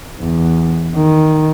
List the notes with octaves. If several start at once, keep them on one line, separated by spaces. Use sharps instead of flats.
E2
D#3